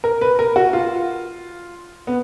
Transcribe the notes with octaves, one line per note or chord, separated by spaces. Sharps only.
A#4
B4
A#4
F#4
F4
B3